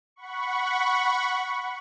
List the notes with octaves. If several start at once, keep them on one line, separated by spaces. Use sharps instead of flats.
F#5 B5 C#6